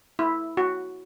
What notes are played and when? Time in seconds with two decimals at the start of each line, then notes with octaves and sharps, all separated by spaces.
0.19 E4
0.57 F#4